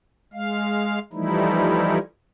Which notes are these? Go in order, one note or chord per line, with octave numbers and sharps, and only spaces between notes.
G#3 F5
E3 F3 G3 A3 D#4 E4